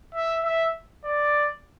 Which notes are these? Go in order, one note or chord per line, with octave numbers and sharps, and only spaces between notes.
E5
E5
D5